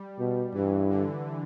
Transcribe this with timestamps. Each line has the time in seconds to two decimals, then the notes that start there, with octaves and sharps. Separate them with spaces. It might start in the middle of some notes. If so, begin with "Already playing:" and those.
Already playing: G3
0.19 B2
0.54 G2 E3
0.89 D3